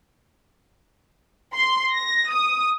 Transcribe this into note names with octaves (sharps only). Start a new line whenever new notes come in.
C6
A#6
D#6